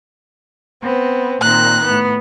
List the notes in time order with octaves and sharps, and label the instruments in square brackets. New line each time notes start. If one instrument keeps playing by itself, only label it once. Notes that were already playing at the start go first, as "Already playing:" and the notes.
[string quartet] B3 C4
[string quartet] A#2 D#3 C4 [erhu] F#6
[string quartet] A2 B3